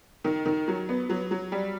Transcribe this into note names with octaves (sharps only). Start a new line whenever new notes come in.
D#3
D#3
F#3
B3
F#3
F#3
G3